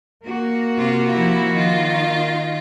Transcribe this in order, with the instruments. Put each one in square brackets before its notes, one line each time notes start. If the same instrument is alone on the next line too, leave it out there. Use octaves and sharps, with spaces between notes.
[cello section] A#3 F#4
[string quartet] C3 F4
F3 E4
D#3 F4